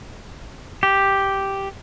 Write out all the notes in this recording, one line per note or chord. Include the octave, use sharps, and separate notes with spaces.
G4